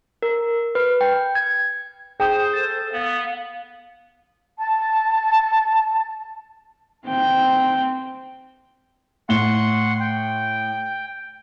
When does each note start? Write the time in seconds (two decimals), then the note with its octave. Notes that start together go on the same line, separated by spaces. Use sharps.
0.22 A#4
0.75 B4
1.01 G5
1.35 G#6
2.20 G#4 C5 G5 D#6
2.54 A4 A6
2.93 B3 F5
4.57 A5
7.06 C4 G5
9.29 A2 F#5 C6 C#6 G7
10.00 G5